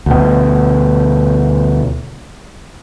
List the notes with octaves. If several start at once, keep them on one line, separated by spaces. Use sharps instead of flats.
D2 B2